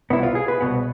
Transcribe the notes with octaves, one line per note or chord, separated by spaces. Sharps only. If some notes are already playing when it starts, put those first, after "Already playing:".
C2 B2 B3 E4
F4
G#4
B4
C2 B2 B3